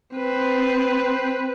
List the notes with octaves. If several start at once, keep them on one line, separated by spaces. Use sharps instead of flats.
C4 B4